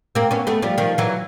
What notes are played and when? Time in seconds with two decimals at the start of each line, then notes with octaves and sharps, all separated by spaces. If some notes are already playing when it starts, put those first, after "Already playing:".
0.15 A#3 C4
0.31 B3 C#4
0.47 A3 B3
0.62 F3 G3
0.78 D#3 F3
0.98 E3 F#3